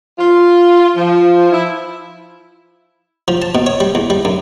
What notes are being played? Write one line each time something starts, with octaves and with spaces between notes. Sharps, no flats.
F4
F3
E4
F3
A5
B2
C#5
G3
E2
G3
F#2